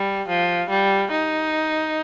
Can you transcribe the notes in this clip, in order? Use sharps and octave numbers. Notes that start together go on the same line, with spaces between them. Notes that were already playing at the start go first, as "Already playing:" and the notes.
Already playing: G3
F3
G3
D#4